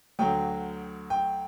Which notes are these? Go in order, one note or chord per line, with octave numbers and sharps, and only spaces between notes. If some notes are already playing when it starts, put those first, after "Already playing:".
D2 D3 F#3 G5
G5